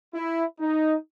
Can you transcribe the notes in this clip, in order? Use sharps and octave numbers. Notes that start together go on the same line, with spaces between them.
E4
D#4